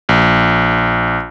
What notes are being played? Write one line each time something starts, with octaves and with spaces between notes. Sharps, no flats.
A#1